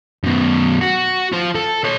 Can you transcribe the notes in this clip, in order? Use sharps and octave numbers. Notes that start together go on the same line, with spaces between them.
F#2 B2
F#4
F4 C5
A4
B4 C#5